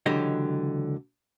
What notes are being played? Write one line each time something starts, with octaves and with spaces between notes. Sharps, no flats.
C#2 D3 E3 F#3 G4 D#5